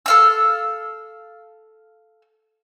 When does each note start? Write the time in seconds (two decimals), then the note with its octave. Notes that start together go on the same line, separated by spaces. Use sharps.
0.06 A4 F5 E6